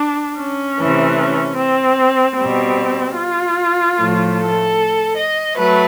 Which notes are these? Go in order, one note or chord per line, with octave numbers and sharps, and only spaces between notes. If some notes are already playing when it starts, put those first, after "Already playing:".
Already playing: D4
C#4
C3 E3 A3
C#4
C4
B2 G3 C4
F4
A2 F3 A3
A4
D#5
F#3 A3 B4